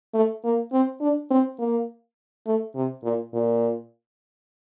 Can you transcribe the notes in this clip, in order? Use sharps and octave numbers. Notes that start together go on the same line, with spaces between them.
A3
A#3
C4
D4
C4
A#3
A3
C3
A#2
A#2